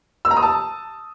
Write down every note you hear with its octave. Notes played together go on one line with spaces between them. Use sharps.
E6
A#5
D#6
A5